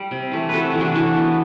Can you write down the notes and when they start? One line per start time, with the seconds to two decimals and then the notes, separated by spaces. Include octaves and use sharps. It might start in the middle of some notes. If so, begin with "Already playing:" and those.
Already playing: G3
0.11 C3
0.32 E3 A3
0.49 C3 F#4 A4 B4
0.74 E3 A3
0.81 D4 F#4
0.95 E3 F#4 A4
1.16 B3